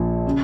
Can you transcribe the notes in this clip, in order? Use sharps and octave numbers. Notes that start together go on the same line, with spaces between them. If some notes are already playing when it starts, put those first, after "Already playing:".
Already playing: A#1 A#2 F3
C#3